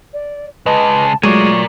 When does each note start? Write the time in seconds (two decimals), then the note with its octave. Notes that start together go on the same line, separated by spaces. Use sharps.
0.13 D5
0.66 C#3 G#3 B4 D#5 A5
1.23 F#3 G#3 A3 F4 A#4 D5 C#6